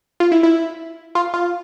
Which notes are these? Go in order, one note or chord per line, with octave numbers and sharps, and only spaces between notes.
F4
E4
E4
F4
F4